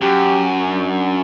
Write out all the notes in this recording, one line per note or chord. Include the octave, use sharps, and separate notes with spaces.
F#2 G4
D4